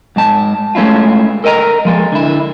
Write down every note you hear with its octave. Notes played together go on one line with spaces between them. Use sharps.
G#2 G#3 A5
G#3 A3 C#4 E4 F4
A4 A#4 D#5 A5 A#5
F3 G#3 A4
D3 E4